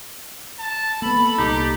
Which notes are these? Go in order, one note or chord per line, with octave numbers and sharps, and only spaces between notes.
A5
A#3 B3 A4 B5
C2 A#2 D#4 G4